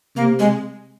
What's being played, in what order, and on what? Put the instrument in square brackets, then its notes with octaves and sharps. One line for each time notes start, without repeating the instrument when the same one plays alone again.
[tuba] C3 [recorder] A#3
[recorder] G#3